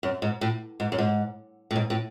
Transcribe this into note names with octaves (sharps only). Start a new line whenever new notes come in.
F#2
G#2
A2
G#2
F#2
G#2
A2
G#2
A2